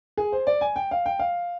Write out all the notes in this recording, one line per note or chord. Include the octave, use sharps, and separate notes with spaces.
G#4
C5
D5
G#5
G5
F5
G5
F5